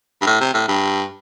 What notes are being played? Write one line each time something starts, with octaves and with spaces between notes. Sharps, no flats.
G2
A2
C3
A2
G2